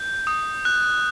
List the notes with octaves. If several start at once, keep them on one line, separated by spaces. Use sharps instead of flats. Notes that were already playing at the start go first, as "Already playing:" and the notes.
Already playing: G6
D#6
F#6